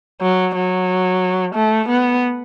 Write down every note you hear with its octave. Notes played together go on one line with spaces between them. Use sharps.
F#3
F#3
A3
B3